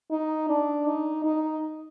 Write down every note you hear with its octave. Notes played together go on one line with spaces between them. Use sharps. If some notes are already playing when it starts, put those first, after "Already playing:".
D#4
D4
D#4
D#4